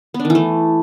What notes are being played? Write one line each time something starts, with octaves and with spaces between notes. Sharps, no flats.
B3
D4
D#3
E3
A3